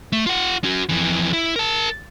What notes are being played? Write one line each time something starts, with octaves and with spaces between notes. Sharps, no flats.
A3
F4 F#5
C#4 F#4
F2 E3
E4
A#4 A5